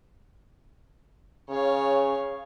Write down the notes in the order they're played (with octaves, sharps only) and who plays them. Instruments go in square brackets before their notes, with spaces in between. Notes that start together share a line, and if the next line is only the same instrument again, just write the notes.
[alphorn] C#3 [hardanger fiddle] C#5 F5